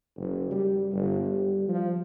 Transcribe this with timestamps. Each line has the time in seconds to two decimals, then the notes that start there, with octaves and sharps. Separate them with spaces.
0.16 F#1
0.51 G3
0.92 G1
1.26 G3
1.68 F3